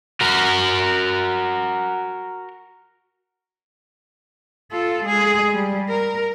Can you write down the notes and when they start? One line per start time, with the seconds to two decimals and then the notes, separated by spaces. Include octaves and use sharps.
0.21 F#4 A#4
4.72 F4 A4
5.04 G#3 G#4
5.53 G3
5.89 A#4